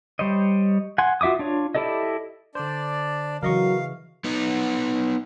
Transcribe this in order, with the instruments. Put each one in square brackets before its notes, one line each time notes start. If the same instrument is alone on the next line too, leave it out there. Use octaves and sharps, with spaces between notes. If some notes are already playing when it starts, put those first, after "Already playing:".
[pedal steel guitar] G3 C5 C#5 D#5
F#5 G#5 C6
F4 F#4 E5 D6 D#6
D4 F4 C#5
E4 G4 A4 D5 D#5
[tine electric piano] D3 C5 [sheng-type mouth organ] D4 D5
[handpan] C#3 E3 [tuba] F#3 [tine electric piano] A#4 D#5 C#6 [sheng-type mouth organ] F5
[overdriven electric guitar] B3 D#4